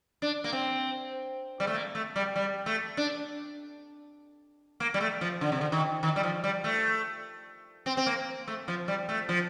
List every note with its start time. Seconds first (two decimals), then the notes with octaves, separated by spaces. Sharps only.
0.22 D4
0.44 A#3
0.52 C4
1.60 G3
1.67 A3
1.74 A#3
1.95 A3
2.16 G3
2.36 G3
2.66 A3
2.97 D4
4.80 A#3
4.94 G3
5.01 A3
5.21 F3
5.41 D3
5.52 C3
5.61 D3
5.72 D#3
6.03 D#3
6.16 G3
6.23 F3
6.44 G3
6.64 A3
7.86 C4
7.97 C4
8.06 A#3
8.48 A3
8.68 F3
8.88 G3
9.09 A3
9.29 F3